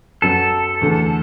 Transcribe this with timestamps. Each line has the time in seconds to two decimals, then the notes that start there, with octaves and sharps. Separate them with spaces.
0.22 F#2 F#3 B3 A4
0.81 E2 D3 A3